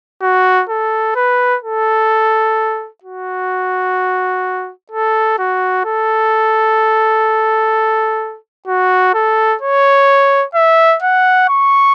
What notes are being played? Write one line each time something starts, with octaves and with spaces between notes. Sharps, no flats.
F#4
A4
B4
A4
F#4
A4
F#4
A4
F#4
A4
C#5
E5
F#5
C#6